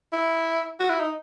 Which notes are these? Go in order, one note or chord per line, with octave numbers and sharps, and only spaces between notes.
E4
F#4
E4
D#4